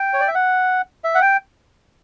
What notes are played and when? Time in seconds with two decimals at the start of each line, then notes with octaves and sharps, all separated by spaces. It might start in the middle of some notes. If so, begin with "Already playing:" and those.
Already playing: G5
0.13 C#5
0.21 D5
0.28 E5
0.35 F#5
1.04 E5
1.15 F#5
1.21 G5